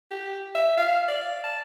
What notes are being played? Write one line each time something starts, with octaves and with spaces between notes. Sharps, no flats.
G4
E5
F5
D5
A5